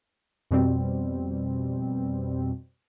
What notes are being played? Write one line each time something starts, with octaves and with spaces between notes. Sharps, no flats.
F2 B2 G3 C4